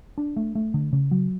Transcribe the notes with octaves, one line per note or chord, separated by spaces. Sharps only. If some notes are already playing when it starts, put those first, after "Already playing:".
D4
A3
A3
D3
C#3
F#3